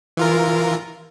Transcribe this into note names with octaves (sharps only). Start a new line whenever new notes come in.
E3 F4 A#4